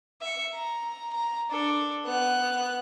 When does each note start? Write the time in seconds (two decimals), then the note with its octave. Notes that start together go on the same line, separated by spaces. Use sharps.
0.22 E5 C#7
0.54 A#5
1.13 A#5
1.51 D4 A4
2.05 B3 F#6